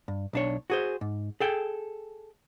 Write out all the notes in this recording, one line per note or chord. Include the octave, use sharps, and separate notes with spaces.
G2
B1 D4 C#5
F#4 G#4 C5
G#2
G#4 A4 G5